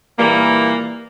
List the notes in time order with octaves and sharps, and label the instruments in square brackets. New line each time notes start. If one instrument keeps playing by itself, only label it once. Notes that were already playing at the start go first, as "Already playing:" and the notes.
[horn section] A#2 E3 G3 A#3